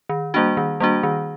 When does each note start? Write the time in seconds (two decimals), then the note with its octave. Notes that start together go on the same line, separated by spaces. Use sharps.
0.09 D#3
0.34 G3 A#3 D4 F#4
0.57 D#3
0.80 G3 A#3 D4 F#4
1.03 D#3